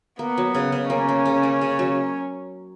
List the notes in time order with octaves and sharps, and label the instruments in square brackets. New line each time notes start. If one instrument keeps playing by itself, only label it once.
[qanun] A#3 [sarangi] B3
[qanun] F#3
C#3
C#3
[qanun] A#3 [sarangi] C#4
[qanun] A#3
C#3
A#3
C#3
F#3